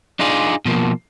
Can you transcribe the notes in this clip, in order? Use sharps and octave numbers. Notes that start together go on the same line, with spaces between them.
D4 D#4 F4 G#4 D5
B2 F3 A#3